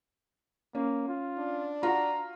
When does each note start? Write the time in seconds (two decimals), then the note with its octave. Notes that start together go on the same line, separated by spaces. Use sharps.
0.75 A#3 C#4
1.08 F4
1.38 D4
1.83 F4 F#4 A#5